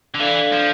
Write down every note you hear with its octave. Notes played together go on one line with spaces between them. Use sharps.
D3
E3 D4 A4 D5 F5
F3